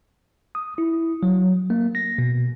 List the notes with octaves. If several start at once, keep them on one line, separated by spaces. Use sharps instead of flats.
D#6
E4
F#3
A#3
A#6
B2